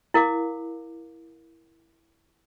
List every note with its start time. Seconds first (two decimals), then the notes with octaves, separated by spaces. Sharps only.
0.14 E4 A#4 F5 D6